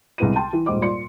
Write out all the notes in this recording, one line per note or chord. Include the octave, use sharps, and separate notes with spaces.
C2 G#3 B3 E4 D#7
G5 A5 C6
E3
D#1 G#2 G3 C5 D#5 D6
A#2 D5 C6 C#7